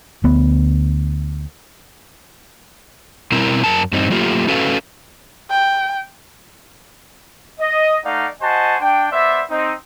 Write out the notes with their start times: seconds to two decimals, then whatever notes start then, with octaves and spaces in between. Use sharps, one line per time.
0.24 D2 B3
3.32 B2 G3 C4 E4 A#4
3.64 F#2 A#4 A5
3.93 G2 C4 D#4
4.10 F#3 A3 A#3 F4 G4
4.48 C#4 F#4 A4 B4 F5
5.50 G5
7.59 D#5
8.05 A3 D#4 D5 F5 F#5
8.41 F#4 C5 D#5 G#5 A5
8.80 D4 G5
9.11 B3 C5 D5 E5
9.49 C4 D#4